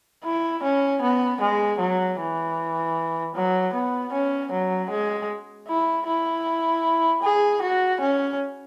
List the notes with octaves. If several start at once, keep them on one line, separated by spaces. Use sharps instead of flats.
E4
C#4
B3
G#3
F#3
E3
F#3
B3
C#4
F#3
G#3
E4
E4
G#4
F#4
C#4